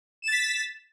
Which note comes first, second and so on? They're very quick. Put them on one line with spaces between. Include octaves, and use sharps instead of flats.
E7 A6 B6